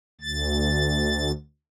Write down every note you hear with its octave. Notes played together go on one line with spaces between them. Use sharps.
D2 A6